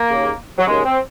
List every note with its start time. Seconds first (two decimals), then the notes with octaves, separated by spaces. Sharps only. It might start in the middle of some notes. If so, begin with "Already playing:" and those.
Already playing: A#3
0.10 D#2 C#3
0.59 F#3
0.66 D#2 C#3 G#3
0.85 C4